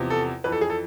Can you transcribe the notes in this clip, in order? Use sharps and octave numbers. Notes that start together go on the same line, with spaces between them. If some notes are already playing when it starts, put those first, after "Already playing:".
Already playing: E2 C3 F3
A4
F2 E3 B4
A4
G#4
A4